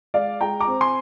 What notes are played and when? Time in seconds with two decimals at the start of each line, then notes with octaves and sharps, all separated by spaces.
0.14 G#3 D5 F5
0.41 G#3 G5 A#5
0.60 A#5 D6
0.68 C4
0.81 G#5 C6